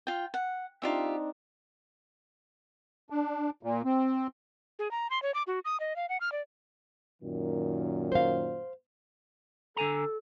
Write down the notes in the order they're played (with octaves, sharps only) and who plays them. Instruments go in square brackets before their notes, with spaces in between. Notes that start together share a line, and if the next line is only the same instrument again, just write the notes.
[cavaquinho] F4 G5
F#5
[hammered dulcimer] C4 D4 D#4 [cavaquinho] F4 G4 E5
[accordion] D4
A#2
C4
[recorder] G#4
A#5
C6
C#5
D6
F#4
D#6
D#5
F5
F#5
F6
D5
[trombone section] F#2 A#2 D#3
[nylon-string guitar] C5 F5
[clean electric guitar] D3 G#5 A#5 [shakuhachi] A4